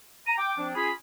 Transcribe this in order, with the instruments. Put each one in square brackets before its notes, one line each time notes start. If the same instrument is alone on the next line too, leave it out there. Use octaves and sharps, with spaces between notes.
[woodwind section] A#5 [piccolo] D#7
[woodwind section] G5 [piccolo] D6
[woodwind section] F3 C4 D4
[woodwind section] C#4 F4 G#4 [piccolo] B5